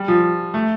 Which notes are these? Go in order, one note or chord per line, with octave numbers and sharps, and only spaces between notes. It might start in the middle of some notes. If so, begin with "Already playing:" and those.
Already playing: G3
F3
A3